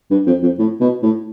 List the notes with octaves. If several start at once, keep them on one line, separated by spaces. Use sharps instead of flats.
G2
F2
F2
A2
B2
A2